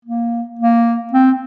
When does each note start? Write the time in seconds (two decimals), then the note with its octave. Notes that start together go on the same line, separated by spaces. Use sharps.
0.05 A#3
0.59 A#3
1.13 C4